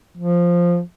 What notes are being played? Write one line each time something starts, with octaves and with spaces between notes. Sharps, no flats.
F3